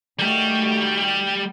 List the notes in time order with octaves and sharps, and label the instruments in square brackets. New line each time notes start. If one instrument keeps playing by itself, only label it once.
[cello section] D#3 A3 F#4 [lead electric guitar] G3 G4